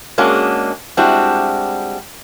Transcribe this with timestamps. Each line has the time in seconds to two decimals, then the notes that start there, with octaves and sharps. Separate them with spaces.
0.18 G#3 A#3 C#4 D4 F#4 G#4
0.97 G3 G#3 C4 D4 E4 F#4